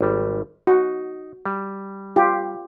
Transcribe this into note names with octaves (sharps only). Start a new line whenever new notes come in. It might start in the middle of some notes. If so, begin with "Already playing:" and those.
G#1 G3
D#4 F#4
G3
F4 G4